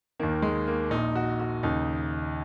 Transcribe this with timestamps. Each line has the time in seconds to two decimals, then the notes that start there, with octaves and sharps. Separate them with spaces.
0.20 D#2 D#3 A#3
0.42 G#3
0.68 A#3
0.90 A#1 A#2 D#4
1.15 F#4
1.40 F#4
1.63 D#2 C#3 D#4